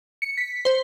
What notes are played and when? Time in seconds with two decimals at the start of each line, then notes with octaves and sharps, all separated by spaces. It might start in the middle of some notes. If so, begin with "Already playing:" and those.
0.22 C#7
0.37 B6
0.65 C5